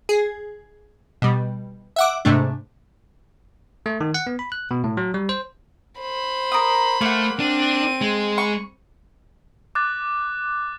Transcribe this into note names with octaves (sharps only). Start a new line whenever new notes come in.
G#4
B2 G3
E5 F#5 D6
G#2 C3 A3 D4
A3
D#3
F#5
B3
B5
F#6
B2
A2
F#3
G3
C5
C5 B5
A#4 D#6
A3 A#3 F#5
C4 D4 D#7
G#3
C#6
D6 F#6 A6